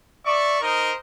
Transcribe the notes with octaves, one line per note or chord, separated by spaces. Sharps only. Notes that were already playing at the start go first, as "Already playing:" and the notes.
D5 E5 C#6
D#4 A#4 C5 D#5